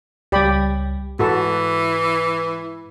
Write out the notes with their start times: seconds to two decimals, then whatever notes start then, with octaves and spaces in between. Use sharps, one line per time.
0.32 C#2 G3 G4 D5 B5
1.19 G#2 E3 F#4 A4 B5